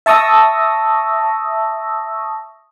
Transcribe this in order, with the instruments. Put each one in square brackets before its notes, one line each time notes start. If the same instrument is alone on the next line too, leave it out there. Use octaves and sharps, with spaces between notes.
[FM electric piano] E5 A5 C#6 D#6 E6 A#6